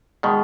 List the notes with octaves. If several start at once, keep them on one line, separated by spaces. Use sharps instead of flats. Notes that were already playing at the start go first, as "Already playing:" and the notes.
B2 D#3 G#3